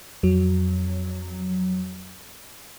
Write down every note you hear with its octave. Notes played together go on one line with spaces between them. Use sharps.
F2 F#3